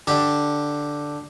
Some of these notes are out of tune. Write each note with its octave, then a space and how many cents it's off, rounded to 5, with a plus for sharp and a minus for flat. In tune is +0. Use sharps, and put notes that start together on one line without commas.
D3 +0 G4 +0